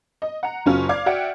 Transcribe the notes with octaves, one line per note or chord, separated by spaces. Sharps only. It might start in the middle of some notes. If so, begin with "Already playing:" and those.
D#5
F#5 A#5
F#1 F#3 C#4 F4 F6
D5 F5 D6 F6 G#6
F#4 D5 E5 F#5 G5